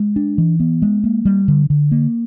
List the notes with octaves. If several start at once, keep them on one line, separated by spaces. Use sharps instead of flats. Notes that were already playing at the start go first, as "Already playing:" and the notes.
Already playing: G#3
D4
E3
B3
G#3
A#3
G3
D3
D3
A#3